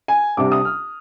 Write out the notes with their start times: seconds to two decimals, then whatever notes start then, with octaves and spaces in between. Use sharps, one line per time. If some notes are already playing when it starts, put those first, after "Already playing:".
0.08 G#5
0.37 C2 C3 G3 D4 D6
0.52 D#6
0.65 F6